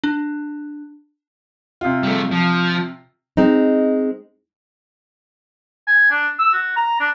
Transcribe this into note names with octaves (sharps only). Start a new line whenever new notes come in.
D4
C3 F4
G3 A3
F3
G#3 C4 D#4
G#5
D4
E6
F#4
A#5
D4